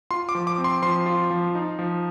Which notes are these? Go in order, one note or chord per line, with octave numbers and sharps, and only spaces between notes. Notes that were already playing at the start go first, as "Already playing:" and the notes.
F4 C6
D6
F3
D6
C4
C6
F3 C6
F4
F3
D#4
F3